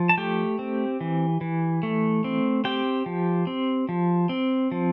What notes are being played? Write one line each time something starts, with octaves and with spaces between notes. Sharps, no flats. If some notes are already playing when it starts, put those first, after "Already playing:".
Already playing: F3
A5
A3 G4 G5
C4
E3
E3
A3
C4
C4 G4 G5
F3
C4
F3
C4
F3